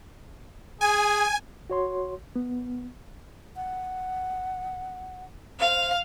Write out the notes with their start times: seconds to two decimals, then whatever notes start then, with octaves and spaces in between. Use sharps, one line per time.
0.81 G#4 G#5
1.70 F#4 C#5 C6
2.36 B3
3.56 F#5
5.60 C5 F5